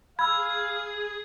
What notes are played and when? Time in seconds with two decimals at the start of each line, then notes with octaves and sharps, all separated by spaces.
0.19 G#4 F5 B5 E6 G#6